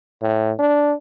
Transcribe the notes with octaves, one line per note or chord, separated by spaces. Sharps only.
A2
D4